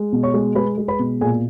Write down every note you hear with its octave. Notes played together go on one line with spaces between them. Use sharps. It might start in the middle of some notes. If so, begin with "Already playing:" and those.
Already playing: G#3
B2
C#5 C#6
G#3
G#3 B4 B5
G#3
B4 B5
B2
A#2 G#4 G#5